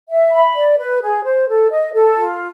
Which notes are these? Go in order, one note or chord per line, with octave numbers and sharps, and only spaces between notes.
E5
B5
D5
B4
G#4
C5
A4
D#5
A4
F4